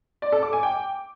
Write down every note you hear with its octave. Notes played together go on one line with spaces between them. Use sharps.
D5
A4
D6
G#5
G5